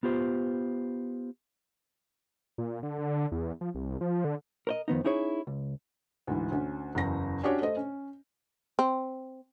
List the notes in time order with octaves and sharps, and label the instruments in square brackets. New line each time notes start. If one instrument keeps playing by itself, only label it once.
[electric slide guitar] B3 F4 G4 C5
[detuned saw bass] A#2
D3
D3
E2
F3
C2
F3
D3
[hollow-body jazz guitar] A#4 C5 D#5
F2 D#3 B3 D#4
C#4 D#4 E4 G#4 C#5
C#2
[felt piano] D2 G#2 E3
D2 C#4
F#1 E2 A#6
C#4 D4 F#4 G4 C#5
A3 C5 D#5
C#4
[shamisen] C4